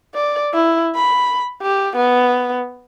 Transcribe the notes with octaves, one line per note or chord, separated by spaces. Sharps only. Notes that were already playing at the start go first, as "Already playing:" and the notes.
D5
E4
B5
G4
B3